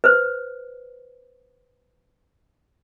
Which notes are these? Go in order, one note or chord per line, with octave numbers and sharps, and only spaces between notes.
B4 C5